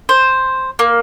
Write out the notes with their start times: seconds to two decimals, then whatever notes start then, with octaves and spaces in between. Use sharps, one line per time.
0.09 C5
0.79 A#3